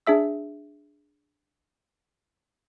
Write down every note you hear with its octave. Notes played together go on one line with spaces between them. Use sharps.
D4 G#4 E5 E6